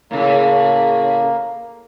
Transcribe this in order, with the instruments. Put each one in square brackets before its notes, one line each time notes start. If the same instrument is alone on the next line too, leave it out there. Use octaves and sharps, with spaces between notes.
[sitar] A2 C#3 [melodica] A#3